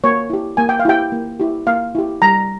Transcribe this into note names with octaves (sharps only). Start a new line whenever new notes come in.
A#3 C#5
E4 G4
A#3 G#5
G5
F5
E4 G4 G5
A#3
E4 G4
A#3 F5
E4 G4
G3 A#5